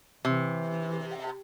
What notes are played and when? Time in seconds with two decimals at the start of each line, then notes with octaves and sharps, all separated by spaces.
0.25 C3 E3